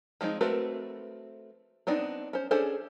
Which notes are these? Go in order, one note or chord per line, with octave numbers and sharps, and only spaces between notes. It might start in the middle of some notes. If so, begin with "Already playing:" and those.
F3 G#3 C4 D#4
A3 C4 F#4 A#4 B4
B3 C4 D4 D#4
C#4 C5
C#4 D4 G#4 A4 C5